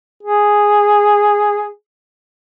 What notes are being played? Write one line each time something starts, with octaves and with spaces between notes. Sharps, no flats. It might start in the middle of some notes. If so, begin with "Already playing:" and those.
G#4